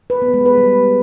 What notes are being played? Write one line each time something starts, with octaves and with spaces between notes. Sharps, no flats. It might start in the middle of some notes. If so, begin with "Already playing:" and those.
B4
B3
G#3
B4
G3